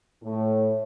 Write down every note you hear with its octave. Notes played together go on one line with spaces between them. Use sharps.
A2